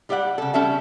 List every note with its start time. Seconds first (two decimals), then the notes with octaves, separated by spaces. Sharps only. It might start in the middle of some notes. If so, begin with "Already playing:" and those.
0.09 G3 G4 D5 E5 F#5
0.38 C#3 A4
0.54 G3 C#4 A4 E5 A5